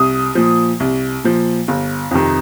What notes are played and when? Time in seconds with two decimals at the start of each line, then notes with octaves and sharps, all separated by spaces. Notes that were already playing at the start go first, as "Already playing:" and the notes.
Already playing: C2 D#6
0.35 A#2 F3
0.80 C2
1.24 A#2 F3
1.68 G1
2.11 F2 C3 D#3